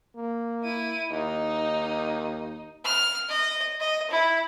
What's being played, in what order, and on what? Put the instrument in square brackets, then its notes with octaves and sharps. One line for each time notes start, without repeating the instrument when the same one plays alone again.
[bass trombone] A#3
[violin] E4 D#7
[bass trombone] D#2 [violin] D#4
[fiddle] F6
D#5
D#5
E4